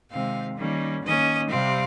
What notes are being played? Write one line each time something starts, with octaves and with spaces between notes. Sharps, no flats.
C3 D#3 G#3 C4 F5
D#3 G3 A#3 C#4
D#3 A#3 C#4 D#5
C3 G3 C4 F5